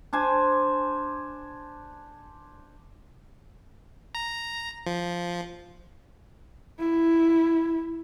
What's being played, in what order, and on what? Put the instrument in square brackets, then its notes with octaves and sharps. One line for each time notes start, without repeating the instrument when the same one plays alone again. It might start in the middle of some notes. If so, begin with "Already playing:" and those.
[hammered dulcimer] D4 C5 G#5
[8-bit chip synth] A#5
F3
[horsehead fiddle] E4